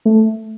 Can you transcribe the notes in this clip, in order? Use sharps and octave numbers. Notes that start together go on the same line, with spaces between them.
A3